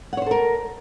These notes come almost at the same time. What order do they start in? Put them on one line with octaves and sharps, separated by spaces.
F#5 C#5 C5 A4 A#4